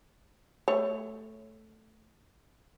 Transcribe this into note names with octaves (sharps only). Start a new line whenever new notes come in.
A3 C#5